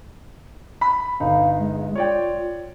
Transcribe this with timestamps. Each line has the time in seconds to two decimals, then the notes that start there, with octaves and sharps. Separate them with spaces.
0.81 B5
1.20 G1 D#4 F5
1.59 G#3
1.95 F4 C#5 D5 G5